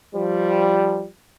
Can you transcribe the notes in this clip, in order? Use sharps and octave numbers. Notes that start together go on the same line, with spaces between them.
F3 G3